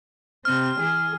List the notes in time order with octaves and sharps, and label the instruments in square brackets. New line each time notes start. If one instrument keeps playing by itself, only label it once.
[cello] C3 C4 [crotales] F6
[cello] E3 G#4